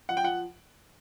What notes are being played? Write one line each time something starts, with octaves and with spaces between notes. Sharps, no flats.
F3 F#5
G5
F3 F#5